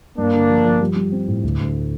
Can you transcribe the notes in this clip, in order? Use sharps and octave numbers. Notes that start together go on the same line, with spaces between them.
G2 A#3 D4
D3
F3
F3
G3
G3
C4
A2
D2
D2